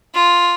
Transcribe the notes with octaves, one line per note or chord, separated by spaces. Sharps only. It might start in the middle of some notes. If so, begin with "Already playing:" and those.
F4